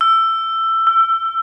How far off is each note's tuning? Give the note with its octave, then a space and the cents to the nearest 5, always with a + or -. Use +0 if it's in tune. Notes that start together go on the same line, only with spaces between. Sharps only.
E6 +15
E6 +25